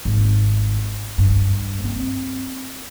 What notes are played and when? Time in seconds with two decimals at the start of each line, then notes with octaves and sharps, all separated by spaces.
0.05 G#1
1.18 G2
1.84 C4